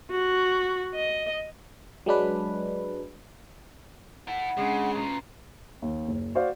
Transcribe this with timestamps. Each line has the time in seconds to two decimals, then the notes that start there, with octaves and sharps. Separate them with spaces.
0.11 F#4
0.95 D#5
2.06 F#3 G#3 D4 B4
4.28 E4 A4 F#5
4.57 C#3 G#3 C#4 D4
4.96 B2 C#4 F4 A#5
5.82 D#2
6.07 F#1
6.35 F#4 C5 D5 F5